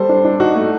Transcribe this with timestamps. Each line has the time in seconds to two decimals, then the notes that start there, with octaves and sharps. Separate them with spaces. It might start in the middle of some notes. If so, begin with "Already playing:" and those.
Already playing: G3 A4 C5
0.09 D4
0.25 D4
0.40 D#4 F#4
0.56 A3